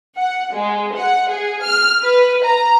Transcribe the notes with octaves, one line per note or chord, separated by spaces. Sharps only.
F#5
G#3
F#5
G#4
F6
B4
A#5